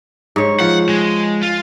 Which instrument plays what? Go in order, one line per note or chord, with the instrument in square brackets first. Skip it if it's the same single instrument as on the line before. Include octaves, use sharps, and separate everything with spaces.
[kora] G#2 C#5
[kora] F3 [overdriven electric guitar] F#5
[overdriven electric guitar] G#3
F4